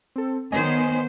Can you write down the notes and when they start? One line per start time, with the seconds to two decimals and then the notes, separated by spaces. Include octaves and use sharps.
0.16 C4 A4
0.52 D#3 B3 C5 C#5 D#5 G#5